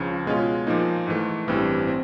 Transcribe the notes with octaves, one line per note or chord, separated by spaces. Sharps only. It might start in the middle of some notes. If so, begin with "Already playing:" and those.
Already playing: C#2 C#3 F3
B2 G#3 C#4 F4
A#2 F3 A#3 D#4
G#2 E3 A3
A1 G2 E3 G3 C4
C4